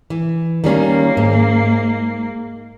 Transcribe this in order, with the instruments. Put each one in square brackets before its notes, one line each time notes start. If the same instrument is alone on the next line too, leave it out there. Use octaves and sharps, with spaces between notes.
[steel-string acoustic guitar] E3
[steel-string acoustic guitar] D#3 G3 C#4 [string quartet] A#3
[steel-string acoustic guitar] G#2